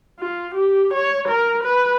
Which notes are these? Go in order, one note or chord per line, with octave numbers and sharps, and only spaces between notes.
F4
G4
C#5
A#4
B4